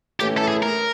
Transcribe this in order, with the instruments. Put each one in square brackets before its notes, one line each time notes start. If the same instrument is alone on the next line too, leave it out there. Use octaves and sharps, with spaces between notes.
[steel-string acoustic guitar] A2 E3 A3 C#4 E4 [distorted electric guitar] G4
[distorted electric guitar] A4
G#4
A#4